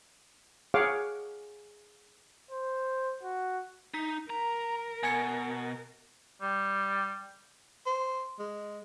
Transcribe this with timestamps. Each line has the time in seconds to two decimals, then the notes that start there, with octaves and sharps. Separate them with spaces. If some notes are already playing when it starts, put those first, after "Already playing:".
0.74 G#4 C#5 F5 F#5 D6
2.51 C5
3.23 F#4
3.94 D#4 B6
4.30 A#4 A#5
5.03 B2 G#5 G#6 C#7
6.42 G3
7.86 C5
8.39 G#3